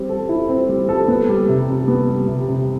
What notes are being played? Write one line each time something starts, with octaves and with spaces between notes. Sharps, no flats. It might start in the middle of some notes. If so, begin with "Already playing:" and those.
Already playing: G3 C4
A4
E4
C4
G3
A4
B3
G3
C3
C3
B3
G3
C3
C3